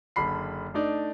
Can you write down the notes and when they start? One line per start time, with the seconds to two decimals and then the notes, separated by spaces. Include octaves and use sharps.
0.16 F#1 D3 B5 C7
0.74 A3 D4 D#4 D5